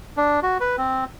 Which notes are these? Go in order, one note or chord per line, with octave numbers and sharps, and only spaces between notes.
D4
F#4
B4
C4